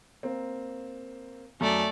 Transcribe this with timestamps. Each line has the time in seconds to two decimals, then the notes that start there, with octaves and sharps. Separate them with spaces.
0.23 A#3 C4
1.61 F#2 A3 D5